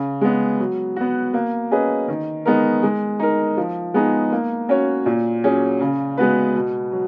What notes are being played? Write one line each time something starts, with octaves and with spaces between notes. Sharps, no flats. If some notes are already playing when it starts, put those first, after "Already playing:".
Already playing: C#3
G#3 B3
F#3
B3 F#4
A#3
C#4 G#4 B4 D#5
D#3
G#3 B3 D#4 A#4
G#3
D#4 A#4
F3
G#3 B3 D#4 G#4
A#3
C#4 F#4 C#5
A#2
F#3 C#4 G#4
C#3
G#3 B3 F#4 B4
B2
F#3